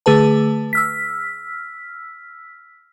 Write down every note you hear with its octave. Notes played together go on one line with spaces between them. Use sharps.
D3 A3 G#4 B4 A5
E6 F6 B6